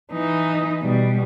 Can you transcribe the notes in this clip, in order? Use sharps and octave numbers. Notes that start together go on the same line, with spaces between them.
E3 D#4
B2 G3